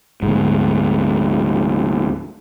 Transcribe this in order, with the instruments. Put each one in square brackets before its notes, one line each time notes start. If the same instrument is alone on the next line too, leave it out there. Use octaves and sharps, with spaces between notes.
[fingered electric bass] D2 G#2